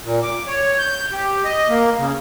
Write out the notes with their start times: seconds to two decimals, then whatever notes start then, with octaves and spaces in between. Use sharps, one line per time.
0.04 A#2
0.23 D6
0.47 C#5
0.79 G6
1.12 G4
1.45 D#5
1.69 A#3
1.98 C#3